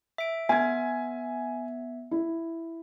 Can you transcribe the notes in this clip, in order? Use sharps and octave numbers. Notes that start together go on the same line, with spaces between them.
E5 D7
B3 E5 G#5 G#6
E4